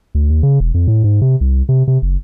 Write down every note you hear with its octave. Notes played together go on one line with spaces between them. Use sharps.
D2
D#2
C#3
E1
F2
A2
G#2
C3
C2
C3
C3
F#1